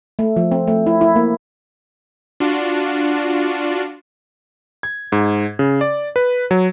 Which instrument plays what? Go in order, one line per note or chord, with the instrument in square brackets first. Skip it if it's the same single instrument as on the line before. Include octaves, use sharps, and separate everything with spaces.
[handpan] A3
F3
C4
A3
E4
E4
A#3
[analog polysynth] D4 F4 F#4
[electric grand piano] G#6
G#2
C#3
D5
B4
F#3